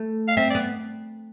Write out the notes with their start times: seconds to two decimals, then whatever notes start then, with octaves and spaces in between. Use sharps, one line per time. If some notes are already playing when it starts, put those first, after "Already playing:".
Already playing: A3
0.28 F5
0.37 C4 E5
0.50 D5
0.55 B3